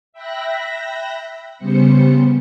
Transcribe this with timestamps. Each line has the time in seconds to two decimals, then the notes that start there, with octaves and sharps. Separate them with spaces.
0.13 E5 G5 B5 E6 F#6 A#6
1.58 C#3 G3 B3 C5 C#7